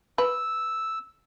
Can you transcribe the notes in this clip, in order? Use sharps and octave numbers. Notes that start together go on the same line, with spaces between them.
B4 E6